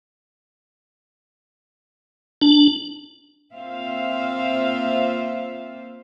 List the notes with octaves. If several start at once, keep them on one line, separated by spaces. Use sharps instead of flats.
D4
A#3 C4 F4 C5 E5 F5